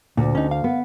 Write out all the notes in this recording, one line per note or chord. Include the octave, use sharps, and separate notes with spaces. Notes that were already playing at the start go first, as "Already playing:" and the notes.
D2 A#2
C#4 D#4
F5
B3